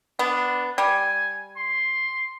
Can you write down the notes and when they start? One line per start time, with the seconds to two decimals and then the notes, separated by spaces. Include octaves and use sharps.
0.19 B3 D4
0.78 G3 G#5
1.57 C6